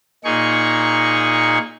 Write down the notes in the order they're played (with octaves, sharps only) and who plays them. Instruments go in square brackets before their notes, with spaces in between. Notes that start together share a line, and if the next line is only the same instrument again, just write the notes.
[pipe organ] A#2 D#4 G#4 C#6